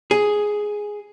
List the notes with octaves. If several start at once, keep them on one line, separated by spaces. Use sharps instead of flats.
G#4